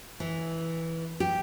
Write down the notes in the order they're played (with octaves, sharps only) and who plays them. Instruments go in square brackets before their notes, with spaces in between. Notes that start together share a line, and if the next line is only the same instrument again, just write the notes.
[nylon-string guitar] E3
G4